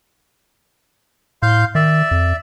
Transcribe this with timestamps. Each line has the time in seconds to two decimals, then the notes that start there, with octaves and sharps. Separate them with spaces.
1.43 A2 F5 C6 G6
1.75 D#3 D5 E5
2.11 F2